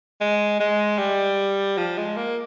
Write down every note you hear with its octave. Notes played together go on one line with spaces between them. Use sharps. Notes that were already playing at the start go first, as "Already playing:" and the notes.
G#3
G#3
G3
F3
G#3
A#3